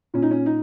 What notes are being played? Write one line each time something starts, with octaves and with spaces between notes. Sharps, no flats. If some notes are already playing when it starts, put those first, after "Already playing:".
A#2 C#4
D#4
C#4
D#4